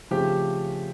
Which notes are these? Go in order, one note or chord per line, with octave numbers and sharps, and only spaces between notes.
C#3 F3 A3 C4 G4